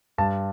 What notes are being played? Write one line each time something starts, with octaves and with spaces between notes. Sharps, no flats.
G2 A5